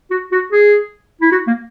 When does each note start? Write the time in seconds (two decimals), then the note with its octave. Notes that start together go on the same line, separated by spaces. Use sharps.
0.11 F#4
0.32 F#4
0.52 G#4
1.21 E4
1.32 F#4
1.47 A#3